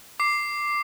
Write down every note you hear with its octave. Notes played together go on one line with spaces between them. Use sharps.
D6 C7